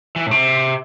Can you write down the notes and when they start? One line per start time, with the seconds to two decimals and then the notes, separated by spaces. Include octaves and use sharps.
0.16 E3
0.27 A2
0.31 C3